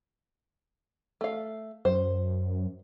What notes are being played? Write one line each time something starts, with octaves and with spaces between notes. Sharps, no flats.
A3 F5
F#2 C5